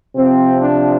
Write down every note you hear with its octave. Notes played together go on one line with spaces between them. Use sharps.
C3 F3 C4
D4